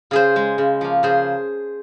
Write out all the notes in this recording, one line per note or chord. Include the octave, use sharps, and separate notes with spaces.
C#3 G#4 C5
G#3
C#3
F3 A#3
C#3 G#4 C5